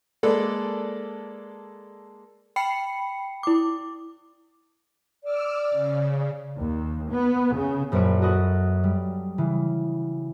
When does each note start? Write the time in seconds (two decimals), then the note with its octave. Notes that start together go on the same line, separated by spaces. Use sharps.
0.23 G#3 A#3 A4 B4 D5
2.56 G5 B5 C7 C#7
3.43 E4 D6
5.24 D5 D6 E6 F6
5.71 C#3
6.58 D#2
7.11 B3
7.53 C#3
7.92 A#1 F#2 F#4 B4 C#5 D7
8.22 F#4 A4 B4 D#5 F#5
8.84 G3
9.38 C#3 E3